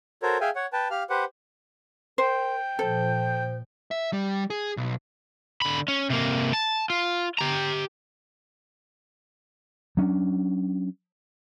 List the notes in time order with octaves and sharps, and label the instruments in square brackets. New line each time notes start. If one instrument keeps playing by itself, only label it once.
[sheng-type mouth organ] F#4 A4 A#4 C5 C#5
G#4 E5 F5 G5 G#5
C#5 F#5
B4 G5 A5
G4 F5 F6
G4 B4 C5 F#5
[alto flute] A#4 [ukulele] C5 [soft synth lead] G5
[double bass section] A#2 F3 [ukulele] A4 [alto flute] C5
[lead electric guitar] E5
G3
G#4
B1
[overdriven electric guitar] D3 B5
C#4
C3 A#3
A5
F4
G4 A#5
[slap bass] F#3 C#4 D4